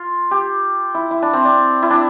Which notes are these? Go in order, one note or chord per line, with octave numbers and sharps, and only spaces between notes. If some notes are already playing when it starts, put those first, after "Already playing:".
Already playing: F4
G4
E4
E4
D4
C4
D4
E4
D4